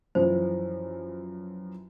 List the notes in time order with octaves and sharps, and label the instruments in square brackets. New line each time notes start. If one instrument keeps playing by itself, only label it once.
[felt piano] F#2 E3 F3 [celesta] C5